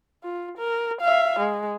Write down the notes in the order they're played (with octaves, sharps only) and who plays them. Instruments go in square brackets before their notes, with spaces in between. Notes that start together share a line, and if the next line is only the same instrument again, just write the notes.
[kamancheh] F4
A#4
E5 F5
G#3